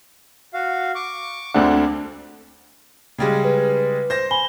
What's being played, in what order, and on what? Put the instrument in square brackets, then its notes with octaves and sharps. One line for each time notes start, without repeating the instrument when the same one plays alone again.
[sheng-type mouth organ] F#4 F5
C#6 D6
[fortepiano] D2 A3 F#5 [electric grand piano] D3 C4 D4
[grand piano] C#3 G3 G#3
[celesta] B4
[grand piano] C5 A#6
[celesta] G#5 B5 G7